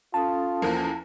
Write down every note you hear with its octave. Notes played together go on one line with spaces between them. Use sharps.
C#4 F4 A4 A5 D#6
E2 F3 A#3